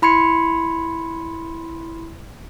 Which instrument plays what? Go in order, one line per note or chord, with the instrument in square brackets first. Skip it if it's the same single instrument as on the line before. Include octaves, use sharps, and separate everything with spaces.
[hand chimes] E4 B5 C6 G#6 C#7